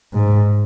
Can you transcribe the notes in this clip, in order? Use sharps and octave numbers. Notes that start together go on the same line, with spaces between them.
G#2